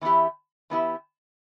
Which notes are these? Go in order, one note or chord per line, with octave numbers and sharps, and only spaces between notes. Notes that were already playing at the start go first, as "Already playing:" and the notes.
E3 B3 E4 G4
E3 B3 E4 G4